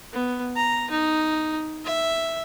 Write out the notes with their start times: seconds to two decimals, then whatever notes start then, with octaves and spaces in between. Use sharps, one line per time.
0.13 B3
0.56 A#5
0.91 D#4
1.85 E5